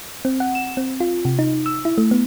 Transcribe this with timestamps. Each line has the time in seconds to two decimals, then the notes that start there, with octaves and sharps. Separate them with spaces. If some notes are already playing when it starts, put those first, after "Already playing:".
0.25 C4
0.40 F#5
0.55 E7
0.77 C4
1.00 F4
1.25 C3
1.39 D#4
1.66 E6
1.85 E4
1.98 A3
2.11 B3